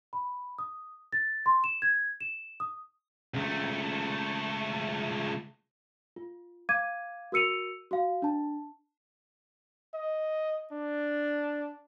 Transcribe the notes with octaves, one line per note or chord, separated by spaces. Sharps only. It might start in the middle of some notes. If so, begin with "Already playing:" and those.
B5
D#6
A6
C6
E7
G#6
E7
D#6
C#2 A3
F4
F5 D6 G#6 D#7
F#4 A#4 E6 C#7 D#7 F7
F#4 F5
D4 A5
D#5
D4